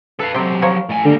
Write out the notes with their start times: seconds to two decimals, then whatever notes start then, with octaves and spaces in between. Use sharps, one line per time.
0.19 A4 B4 F5
0.34 C3 F#3 C4 G4
0.62 F3 A#4 C#5
0.89 A2 G#5
1.05 D3 G3 A#3